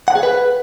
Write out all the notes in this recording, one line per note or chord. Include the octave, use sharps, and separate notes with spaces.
F#5
G#4
B4